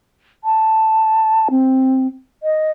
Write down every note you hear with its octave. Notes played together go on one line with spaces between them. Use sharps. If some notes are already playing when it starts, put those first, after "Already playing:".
A5
C4
D#5